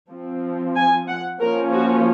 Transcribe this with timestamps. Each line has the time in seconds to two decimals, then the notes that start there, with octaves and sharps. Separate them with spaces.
0.11 F3 C4
0.76 G#5
1.08 F#5
1.41 F3 A#3 C#4 A#4
1.73 F#4